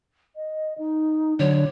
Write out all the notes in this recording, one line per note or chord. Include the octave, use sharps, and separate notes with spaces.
D#5
D#4
D3 F#3 C#5